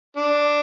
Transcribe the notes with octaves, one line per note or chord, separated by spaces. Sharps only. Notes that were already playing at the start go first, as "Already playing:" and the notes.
D4